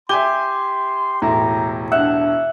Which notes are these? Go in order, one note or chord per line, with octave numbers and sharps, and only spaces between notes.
G4 E5 G#5 C6 G7
E1 A2 E4 A#5
D4 E5 F#5